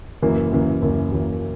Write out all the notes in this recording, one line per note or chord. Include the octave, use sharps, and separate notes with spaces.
F#1 F#2 E3 A#3
F#1 F#2 E3 A#3
F#1 F#2 E3 A#3
F#1 F#2 E3 A#3